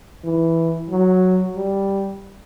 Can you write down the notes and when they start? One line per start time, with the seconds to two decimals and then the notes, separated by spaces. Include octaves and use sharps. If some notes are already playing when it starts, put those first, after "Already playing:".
0.24 E3
0.89 F#3
1.56 G3